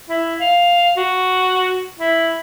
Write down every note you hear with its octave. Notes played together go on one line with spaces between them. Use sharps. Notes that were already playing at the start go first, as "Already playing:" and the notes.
E4
F5
F#4
E4